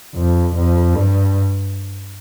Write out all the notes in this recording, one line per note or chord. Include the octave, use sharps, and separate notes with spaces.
F2
F2
G2